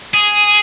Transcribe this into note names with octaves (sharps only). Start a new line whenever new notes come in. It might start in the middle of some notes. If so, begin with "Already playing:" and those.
G#4